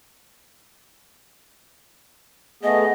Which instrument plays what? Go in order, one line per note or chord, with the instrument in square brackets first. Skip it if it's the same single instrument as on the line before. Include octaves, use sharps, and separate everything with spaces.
[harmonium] A3 B3 G#4 [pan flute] D#5